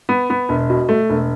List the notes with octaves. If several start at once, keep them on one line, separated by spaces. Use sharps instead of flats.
B3
B3
E1
B2
A3
E1